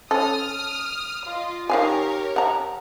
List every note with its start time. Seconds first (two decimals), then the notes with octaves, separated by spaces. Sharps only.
0.11 C#4 A4 D#6 F6
1.24 F4 D#5
1.70 D#3 G4 A#4 C#5 F5 G#5
2.36 F#5 A#5